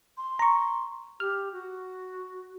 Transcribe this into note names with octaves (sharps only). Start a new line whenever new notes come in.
C6
A#5 C#6
G4 F6
F#4